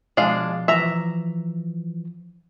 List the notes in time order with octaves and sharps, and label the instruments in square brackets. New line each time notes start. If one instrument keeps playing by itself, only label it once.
[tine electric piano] B2 F3 [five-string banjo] G#3 D4 F5
[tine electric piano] E3 F3 [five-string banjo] E5 A#5